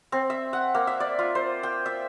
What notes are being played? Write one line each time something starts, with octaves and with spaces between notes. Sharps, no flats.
C4
E5
F#5
A#3
E5
D5
F4
C5
G5
E5